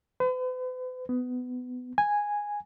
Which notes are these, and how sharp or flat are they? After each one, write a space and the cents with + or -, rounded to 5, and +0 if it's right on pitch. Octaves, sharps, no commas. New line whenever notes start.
B4 +45
B3 +20
G#5 -5